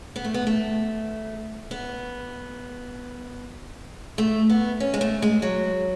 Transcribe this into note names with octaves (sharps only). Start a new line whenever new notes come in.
B3
A3
B3
A3
B3
A3
B3
C#4
G#3
A3
G#3
F#3